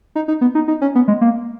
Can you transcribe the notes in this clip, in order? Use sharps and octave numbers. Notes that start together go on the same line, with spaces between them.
D#4
D#4
B3
D#4
D#4
C#4
B3
G#3
A#3